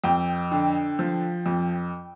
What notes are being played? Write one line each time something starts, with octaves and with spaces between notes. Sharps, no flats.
F2 G5
D3
F3
F2